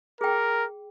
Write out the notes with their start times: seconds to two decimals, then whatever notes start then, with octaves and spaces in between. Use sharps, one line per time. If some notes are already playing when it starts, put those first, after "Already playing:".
0.21 G#4 A#4 G5